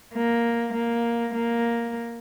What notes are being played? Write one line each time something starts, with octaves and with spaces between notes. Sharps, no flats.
A#3
A#3
A#3